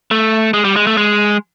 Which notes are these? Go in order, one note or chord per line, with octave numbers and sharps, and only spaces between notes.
A3
G#3
G3
G#3
A3
G#3